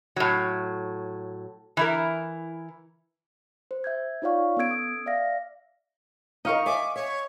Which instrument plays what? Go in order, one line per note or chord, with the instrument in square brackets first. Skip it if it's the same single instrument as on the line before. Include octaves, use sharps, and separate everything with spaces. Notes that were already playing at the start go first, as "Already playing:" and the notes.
[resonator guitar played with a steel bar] A2 F#3
E3 E4 A#4
[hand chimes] C5
E5 G6 G#6
D#4 F4 C#5 D5 F5 C#6
B3 C#4 A4 E6 G#6 D7
D#6
D5 E5 F5 A#6
[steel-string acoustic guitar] D#4 A#4 [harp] D#5 F5 C#6
[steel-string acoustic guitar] E5 G#5 [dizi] D6
[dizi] C#5 [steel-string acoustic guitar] E5